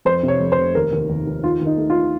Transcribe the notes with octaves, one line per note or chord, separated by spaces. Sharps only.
F2 C5
C3
C#5
F2
C5
F1
D#2 A#4
D#2
D#2
D#2
D#3 F4
D#2
D#4
A3
F4